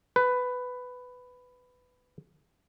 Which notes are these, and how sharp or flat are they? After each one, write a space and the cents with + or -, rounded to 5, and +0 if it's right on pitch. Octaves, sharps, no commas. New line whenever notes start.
B4 +10